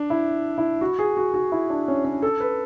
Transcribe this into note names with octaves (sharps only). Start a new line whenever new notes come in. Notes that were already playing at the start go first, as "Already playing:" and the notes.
Already playing: D4
E4
E4
F#4
G#4
F#4
F#4
E4
D4
C#4
C#4
A4
B4